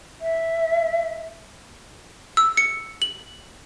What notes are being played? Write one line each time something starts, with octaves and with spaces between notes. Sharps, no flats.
E5
E6
C#7
F#7